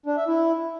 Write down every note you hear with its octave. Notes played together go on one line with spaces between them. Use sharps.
D4
E5
E4